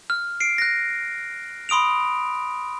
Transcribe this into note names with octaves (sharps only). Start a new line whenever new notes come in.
F6
C7 D7
F#6 A#6
B5 C6 D#6 D7 F7